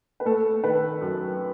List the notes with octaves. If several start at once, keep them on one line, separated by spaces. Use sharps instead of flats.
B4
A3 A4
D#3 B4
F#2